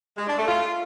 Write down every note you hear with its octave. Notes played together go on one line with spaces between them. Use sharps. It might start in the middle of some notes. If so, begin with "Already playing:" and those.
G#3
D4
A3
F4